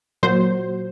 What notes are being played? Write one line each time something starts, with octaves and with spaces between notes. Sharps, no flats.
A#2 F#3 C5